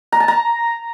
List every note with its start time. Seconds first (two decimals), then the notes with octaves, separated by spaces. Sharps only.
0.12 A#5
0.20 A5
0.28 A#5